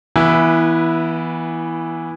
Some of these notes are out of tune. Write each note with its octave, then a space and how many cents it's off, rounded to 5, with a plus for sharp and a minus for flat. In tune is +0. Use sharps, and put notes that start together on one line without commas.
E3 -5 B3 -25 E4 +0